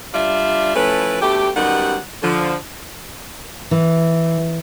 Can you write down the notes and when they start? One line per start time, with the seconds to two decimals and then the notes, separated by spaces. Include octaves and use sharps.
0.14 G3 D4 F4 D5 E5
0.76 F3 A3 C#4 E4 B4
1.21 B2 D3 A3 G4
1.56 F#2 D#3 G3 B3 G4 F#5
2.23 D3 F3
3.71 E3